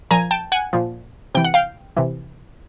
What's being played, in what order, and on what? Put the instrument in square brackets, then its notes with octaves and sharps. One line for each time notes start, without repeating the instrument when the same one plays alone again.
[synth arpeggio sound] A#2 F3 G#5 A#5
G5 A5
F#5 G#5
A#2 F3
C3 E3 G5
F#5
F5 G5
C3 E3